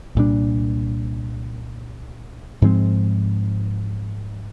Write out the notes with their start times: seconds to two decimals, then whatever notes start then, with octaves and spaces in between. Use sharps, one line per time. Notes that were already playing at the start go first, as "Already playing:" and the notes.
0.15 C2 A#2 G3 D4
2.62 G#2 F3 G#3 C4